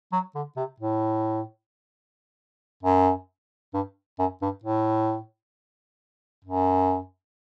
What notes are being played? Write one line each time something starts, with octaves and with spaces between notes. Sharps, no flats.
F#3
D3
C3
A2
F#2
G2
F#2
G2
A2
F#2